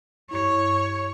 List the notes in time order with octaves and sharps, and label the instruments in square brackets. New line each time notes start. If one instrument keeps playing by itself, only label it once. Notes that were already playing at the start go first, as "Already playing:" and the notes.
[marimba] G2 E4 [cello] C#5